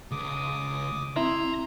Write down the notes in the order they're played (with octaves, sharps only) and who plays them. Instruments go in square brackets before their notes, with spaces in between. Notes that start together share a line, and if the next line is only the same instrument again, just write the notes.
[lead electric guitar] C#2 [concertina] D6 D#6
[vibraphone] C4 [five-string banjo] E4 [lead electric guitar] A#5 [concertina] C6